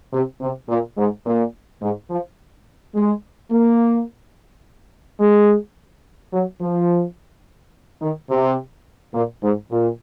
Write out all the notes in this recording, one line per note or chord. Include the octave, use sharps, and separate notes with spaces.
C3
C3
A#2
G#2
A#2
G#2
F3
G#3
A#3
G#3
F#3
F3
D#3
C3
A#2
G#2
A#2